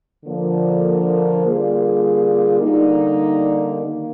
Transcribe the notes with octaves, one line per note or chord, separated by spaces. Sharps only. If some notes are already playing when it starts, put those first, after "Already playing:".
D3 F3 A#3
D3 G3 A#3 F4 G#4
D3 G3 A#3 D#4
D#3 A#3